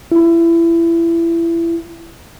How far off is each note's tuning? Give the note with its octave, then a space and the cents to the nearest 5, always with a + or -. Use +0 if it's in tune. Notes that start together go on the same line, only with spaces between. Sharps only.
E4 +25